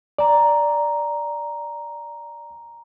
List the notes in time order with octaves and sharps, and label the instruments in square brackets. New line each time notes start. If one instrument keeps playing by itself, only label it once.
[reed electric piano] D5 [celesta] G#5 A#5